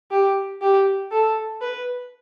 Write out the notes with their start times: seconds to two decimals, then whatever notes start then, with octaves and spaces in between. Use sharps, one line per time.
0.11 G4
0.62 G4
1.11 A4
1.62 B4